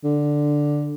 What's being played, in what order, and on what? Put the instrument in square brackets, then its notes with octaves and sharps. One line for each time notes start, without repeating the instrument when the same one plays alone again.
[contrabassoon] D3